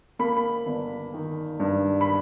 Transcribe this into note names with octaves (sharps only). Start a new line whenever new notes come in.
A#3 B5
B5
G1
D#3
G2
B5